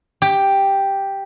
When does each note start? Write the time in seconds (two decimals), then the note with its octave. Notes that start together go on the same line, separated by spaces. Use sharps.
0.22 G4